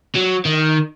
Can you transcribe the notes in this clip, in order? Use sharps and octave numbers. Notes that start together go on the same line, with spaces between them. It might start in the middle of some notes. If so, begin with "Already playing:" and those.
F#3
D#3